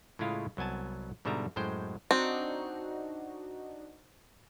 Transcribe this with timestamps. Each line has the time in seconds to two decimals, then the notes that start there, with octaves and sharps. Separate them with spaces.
0.19 A2 C#3 G#3 E4 F4 F5
0.57 C2 F#3 B3 G#5 A5
1.25 G#2 B2 D3 G3 E5 A#5
1.56 F#2 A2 G#3 C5 G5
2.11 C4 D4 D#4 F#4